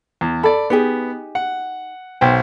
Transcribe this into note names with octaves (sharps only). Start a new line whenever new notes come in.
E2
A4 D5 B5
B3 D#4 G4 G#4
F#5
B1 C5 G5